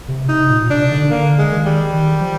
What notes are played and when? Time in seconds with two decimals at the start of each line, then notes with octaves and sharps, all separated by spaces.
0.08 C3
0.28 C3 D#4
0.49 A#2
0.62 A#2
0.70 C3 D4
0.91 D3
1.11 D3 A#3
1.39 G#3
1.52 D#3
1.66 G3
1.94 D#3
2.21 F3